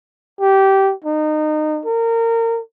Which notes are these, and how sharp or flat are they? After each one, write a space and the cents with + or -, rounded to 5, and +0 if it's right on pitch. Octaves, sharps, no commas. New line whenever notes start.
G4 -15
D#4 -25
A#4 -25